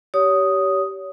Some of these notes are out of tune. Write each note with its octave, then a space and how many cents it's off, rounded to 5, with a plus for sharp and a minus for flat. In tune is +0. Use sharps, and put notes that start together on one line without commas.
G4 -15 C#5 +30 D#6 +0